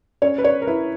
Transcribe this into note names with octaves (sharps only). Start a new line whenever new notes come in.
C#4 C#5
B4
C#5
A#4
E4 B4